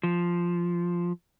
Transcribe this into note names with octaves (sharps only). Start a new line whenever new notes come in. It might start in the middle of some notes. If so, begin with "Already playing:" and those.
F3